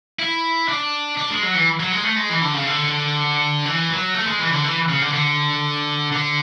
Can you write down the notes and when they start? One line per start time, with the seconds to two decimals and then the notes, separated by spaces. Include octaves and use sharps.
0.19 E4
0.68 D4
1.17 D4
1.30 G#3
1.42 F#3
1.55 E3
1.80 F#3
1.92 G#3
2.04 A3
2.16 G#3
2.29 E3
2.41 D3
2.54 C#3
2.67 D3
3.65 E3
3.90 F#3
4.14 A3
4.27 G#3
4.39 E3
4.52 D3
4.64 E3
4.89 C#3
5.02 D3
5.13 D3
6.12 D3